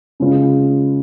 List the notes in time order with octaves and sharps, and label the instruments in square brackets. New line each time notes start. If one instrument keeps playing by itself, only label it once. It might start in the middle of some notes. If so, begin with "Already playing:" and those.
[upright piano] C#3 G#3 C#4 F4